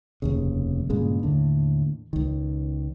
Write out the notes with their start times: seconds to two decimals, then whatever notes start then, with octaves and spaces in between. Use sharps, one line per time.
0.22 F1 D#2 C#3
0.90 G2 A#2 C#3 G#3
1.23 D#2 A2 D3
2.13 C#2 D#3